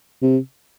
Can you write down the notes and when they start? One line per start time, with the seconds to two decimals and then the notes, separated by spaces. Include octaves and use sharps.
0.22 C3